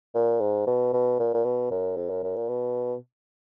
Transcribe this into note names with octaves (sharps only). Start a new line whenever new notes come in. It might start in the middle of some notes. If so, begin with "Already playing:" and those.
A#2
G#2
B2
B2
A#2
A#2
B2
F#2
F2
F#2
F#2
A#2
B2